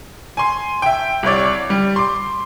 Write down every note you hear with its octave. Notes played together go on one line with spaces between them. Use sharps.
G#5 C6
E5 G5
C2 E4 C#5 D5
G3
C6 D6